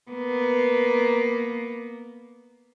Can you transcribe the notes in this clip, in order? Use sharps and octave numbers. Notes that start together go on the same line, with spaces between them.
A#3 B3